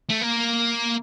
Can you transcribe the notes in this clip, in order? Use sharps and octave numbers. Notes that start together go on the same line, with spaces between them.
A3
A#3